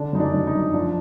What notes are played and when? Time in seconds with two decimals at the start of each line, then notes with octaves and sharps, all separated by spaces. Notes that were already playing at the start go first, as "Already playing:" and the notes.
Already playing: D3 D4
0.13 F#2 D#4
0.20 D4
0.34 F#2
0.47 D#4
0.54 F#2
0.74 F3 D4